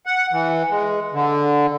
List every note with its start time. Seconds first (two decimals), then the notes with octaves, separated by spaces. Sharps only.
0.06 F#5
0.32 E3
0.71 G#3
1.13 D3